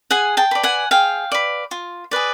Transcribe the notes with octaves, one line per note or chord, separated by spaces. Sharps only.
G#4 F#5 G#5
G5 A5
B4 D5
F#5 G#5
G#4 F5 G5
B4 D5
F4
G#4 B4 D5